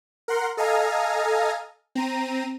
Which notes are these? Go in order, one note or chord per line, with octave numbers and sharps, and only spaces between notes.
A#4 F#5 C6
A4 D#5 F5 G#5 A#5
C4 A#5 D#7